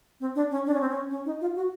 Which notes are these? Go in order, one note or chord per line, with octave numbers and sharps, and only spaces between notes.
C4
D4
C#4
D4
C#4
C4
C#4
C#4
D#4
F4
F#4